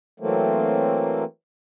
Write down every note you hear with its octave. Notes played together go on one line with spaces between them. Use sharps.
E3 F#3 A3 A#3 C4